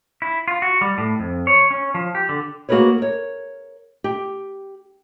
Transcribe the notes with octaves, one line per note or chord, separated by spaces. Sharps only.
E4
F4
F#4
G3
A2
F2
C#5
C#4
F3
G4
D3
A#3 F#4 G#4 A#4 B4 C#5
A#4 C#5
G4